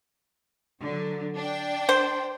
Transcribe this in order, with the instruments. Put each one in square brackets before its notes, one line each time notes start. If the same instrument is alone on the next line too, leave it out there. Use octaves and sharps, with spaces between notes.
[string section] D3 F#3
D4 G5
[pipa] C5